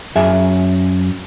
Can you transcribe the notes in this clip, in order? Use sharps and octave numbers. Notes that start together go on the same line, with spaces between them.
F#2 G#4 E5